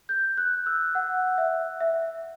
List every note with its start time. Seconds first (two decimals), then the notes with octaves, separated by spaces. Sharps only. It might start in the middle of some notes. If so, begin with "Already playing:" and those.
0.09 G6
0.37 F#6
0.66 E6
0.95 F#5
1.38 E5
1.81 E5